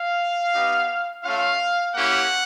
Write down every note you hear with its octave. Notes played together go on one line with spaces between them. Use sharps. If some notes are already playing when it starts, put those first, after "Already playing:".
Already playing: F5
B3 D#4 G4
A3 C#4 F4 F5
A#3 C#4 E4 G4 F#5